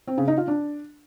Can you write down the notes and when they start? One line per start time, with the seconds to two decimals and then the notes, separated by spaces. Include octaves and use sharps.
0.07 C4
0.18 C#3
0.28 D#4
0.38 F4
0.48 D4